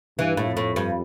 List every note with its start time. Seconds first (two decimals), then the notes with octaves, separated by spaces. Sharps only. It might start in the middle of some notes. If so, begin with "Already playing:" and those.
0.18 G2 E3
0.37 A2
0.47 F2
0.57 A2
0.76 G2